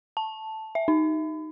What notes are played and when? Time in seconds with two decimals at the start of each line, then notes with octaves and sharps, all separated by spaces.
0.17 A5
0.75 E5
0.88 D#4